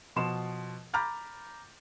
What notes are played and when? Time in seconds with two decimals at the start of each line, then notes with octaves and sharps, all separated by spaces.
0.16 B2 F3 C6 E7
0.94 A#5 B5 D6 F6 G6 A6